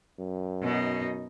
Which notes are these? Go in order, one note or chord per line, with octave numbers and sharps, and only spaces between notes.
F#2
B2 D#4